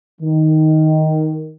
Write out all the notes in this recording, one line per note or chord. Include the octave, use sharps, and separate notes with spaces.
D#3